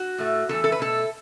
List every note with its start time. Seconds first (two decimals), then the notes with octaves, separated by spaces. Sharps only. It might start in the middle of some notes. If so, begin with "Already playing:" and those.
Already playing: F#4
0.18 A2 A3
0.49 E2 E3 A3 A4
0.64 A4
0.72 B4
0.79 B2 A3 A4